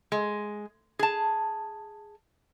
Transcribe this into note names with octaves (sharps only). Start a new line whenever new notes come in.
G#3
G#4 A5